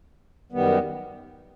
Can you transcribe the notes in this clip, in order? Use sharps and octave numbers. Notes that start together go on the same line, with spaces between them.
F#2 D#3 G3 B3